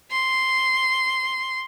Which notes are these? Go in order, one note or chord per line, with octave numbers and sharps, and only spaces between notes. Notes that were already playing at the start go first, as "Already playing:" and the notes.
C6